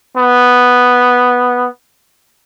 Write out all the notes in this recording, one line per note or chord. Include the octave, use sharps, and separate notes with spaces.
B3